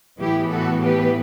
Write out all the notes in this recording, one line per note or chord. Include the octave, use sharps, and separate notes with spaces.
A2 E3 B3 E4 G4
F#4 A4
G4 B4